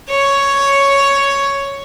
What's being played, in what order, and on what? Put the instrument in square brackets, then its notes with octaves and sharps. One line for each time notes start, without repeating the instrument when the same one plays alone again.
[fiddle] C#5